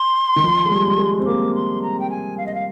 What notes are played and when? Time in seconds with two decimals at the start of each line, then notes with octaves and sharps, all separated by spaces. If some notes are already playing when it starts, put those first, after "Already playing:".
Already playing: C6
0.36 D#3
0.44 F3
0.66 G#3
0.71 G3
0.88 G3
0.99 G#3
1.19 C4
1.26 A#3 D6
1.55 C6
1.82 A#5
1.99 G5
2.10 G#5
2.37 F5
2.46 D#5
2.54 F5